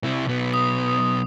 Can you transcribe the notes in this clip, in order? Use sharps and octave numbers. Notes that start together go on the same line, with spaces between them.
C3 E4
B1 B3
D#6